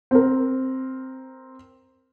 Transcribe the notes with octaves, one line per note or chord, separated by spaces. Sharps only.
C4 A#4